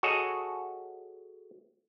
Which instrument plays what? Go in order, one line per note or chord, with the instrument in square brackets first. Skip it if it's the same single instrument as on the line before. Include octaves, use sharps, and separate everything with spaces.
[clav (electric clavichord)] F#4 G#4 A4 C#5 D#5